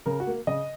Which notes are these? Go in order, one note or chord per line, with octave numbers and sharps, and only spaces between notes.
C#3 A#4
F#4
A#3
C#3 D#5